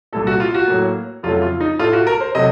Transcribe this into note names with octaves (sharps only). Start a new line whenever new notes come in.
C2 A#2 A3 A4
F#4
F4
F#4
A2 F#3 A#3
F2 C#3 F#3 A3 F4
F4
D#4
A2 A3 F4
F#4
A#4
C5
C3 F#3 A3 D#5